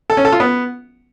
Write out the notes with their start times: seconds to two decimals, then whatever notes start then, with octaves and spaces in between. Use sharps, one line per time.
0.10 A4
0.17 C#4
0.25 A4
0.32 F4
0.40 B3